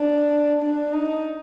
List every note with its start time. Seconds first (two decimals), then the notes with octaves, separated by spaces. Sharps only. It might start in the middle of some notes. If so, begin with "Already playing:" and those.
Already playing: D4
0.62 D4
0.93 D#4